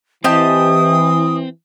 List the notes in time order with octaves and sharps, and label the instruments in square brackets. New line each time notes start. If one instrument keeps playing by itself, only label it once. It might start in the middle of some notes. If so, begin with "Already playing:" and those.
[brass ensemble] E3 [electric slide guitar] C4 [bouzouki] G4 D#5 A5 [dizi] D#6